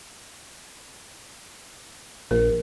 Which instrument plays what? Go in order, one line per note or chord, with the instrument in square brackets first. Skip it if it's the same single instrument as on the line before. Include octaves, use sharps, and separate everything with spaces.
[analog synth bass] A#1 [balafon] A#4